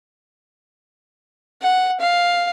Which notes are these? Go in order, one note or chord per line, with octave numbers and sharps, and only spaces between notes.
F#5
F5